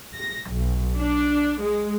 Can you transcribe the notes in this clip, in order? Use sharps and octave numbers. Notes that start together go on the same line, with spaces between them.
A#6
B1
D4
G#3